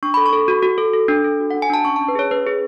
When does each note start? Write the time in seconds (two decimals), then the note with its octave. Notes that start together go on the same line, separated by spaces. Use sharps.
0.03 D4 C#6
0.14 B5
0.17 A4
0.26 C#6
0.33 A4
0.48 F#4
0.63 F#4
0.78 A4
0.93 A4
1.08 D4
1.24 A4
1.40 F#4
1.51 F#5
1.54 D4
1.62 G#5
1.70 D4 A5
1.85 C#4 C#6
1.96 A5
2.01 C#4
2.08 B4
2.15 G#4 C#5
2.31 C#4 B4
2.46 G#4